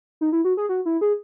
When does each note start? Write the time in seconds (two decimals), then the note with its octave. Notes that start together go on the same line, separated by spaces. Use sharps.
0.21 D#4
0.33 E4
0.45 F#4
0.57 G#4
0.69 F#4
0.86 E4
1.01 G#4